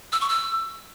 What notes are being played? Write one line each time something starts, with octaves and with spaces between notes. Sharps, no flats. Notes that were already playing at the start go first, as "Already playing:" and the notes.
E6
C#6
E6